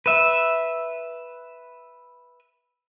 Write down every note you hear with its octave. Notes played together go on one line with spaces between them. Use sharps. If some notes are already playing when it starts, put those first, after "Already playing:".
B4 E5